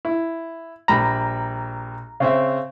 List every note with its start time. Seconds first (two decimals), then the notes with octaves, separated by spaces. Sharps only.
0.05 E4
0.88 A#1 G3 A#5 B5
2.20 C#3 C4 E5